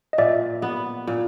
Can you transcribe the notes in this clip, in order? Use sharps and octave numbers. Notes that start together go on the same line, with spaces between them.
D#5
A#2 D5 E5
B3
A#2